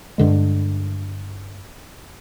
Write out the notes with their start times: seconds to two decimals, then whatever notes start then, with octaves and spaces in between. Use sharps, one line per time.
0.18 G2 D3 G#3